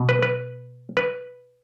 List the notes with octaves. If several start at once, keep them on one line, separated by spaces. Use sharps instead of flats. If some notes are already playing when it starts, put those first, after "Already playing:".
Already playing: B2
B4
B4
B4